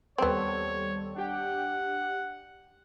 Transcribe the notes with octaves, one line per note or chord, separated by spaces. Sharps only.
D#2 G3 B3 C4 A4 C#5
D4 G4 F#5 G5